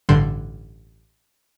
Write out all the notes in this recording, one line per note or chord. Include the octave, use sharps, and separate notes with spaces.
A1 G2 D3 C6 G6